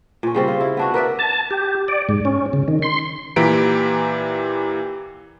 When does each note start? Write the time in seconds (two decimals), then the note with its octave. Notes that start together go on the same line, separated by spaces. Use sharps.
0.23 A#2 C#4
0.34 C#3 G3 C4
0.48 F4
0.61 E4
0.77 B3 D4 F#4
0.94 A#4 B4 D5 E5
1.19 A5
1.51 G4
1.88 D5
2.09 G#2
2.25 C#4
2.53 C#3
2.68 D#3
2.82 C6
3.36 A#2 E3 G4 A#5 B6 D7